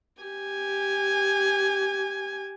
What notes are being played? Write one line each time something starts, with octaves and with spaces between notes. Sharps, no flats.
G4 G#5